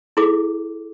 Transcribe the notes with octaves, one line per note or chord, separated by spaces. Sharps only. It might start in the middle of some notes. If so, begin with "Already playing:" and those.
E4 G#4 A4 D6